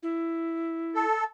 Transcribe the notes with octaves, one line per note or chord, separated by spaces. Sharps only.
E4
A4